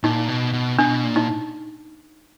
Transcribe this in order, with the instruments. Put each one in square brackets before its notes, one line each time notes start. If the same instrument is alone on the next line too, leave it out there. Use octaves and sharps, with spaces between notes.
[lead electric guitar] A#2 [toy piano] D#4
[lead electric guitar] B2
B2
[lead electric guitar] B2 [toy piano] D4
[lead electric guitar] A#2
[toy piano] D#4